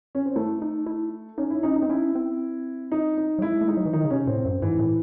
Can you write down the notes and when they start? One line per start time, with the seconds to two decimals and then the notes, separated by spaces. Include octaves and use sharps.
0.15 C#4
0.25 C4
0.36 A3 E4
0.62 D#4
0.86 E4
1.38 C#4 D#4
1.50 E4
1.63 C#4 D#4
1.76 D#4
1.82 C4
1.90 C#4 E4
2.15 C4
2.92 D#4
3.17 D#4
3.39 F#3
3.42 G#3 E4
3.61 A3
3.68 G#3 D#4
3.77 F#3
3.85 E3
3.93 D#3 D#4
4.04 C#3
4.10 C3 C#4
4.27 A2 C4
4.45 F#2 C4
4.62 G#2 E3
4.79 A2 E3